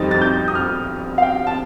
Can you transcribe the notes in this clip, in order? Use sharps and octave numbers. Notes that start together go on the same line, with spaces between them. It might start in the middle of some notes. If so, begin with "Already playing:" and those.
Already playing: F2 D#3 G3 C4 D#4 A6
A6
G6
D#6
F6
F5
G5
A5